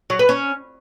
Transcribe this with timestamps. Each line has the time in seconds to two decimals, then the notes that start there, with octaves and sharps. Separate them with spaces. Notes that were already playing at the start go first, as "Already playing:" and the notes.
0.10 F#3
0.19 B4
0.29 C#4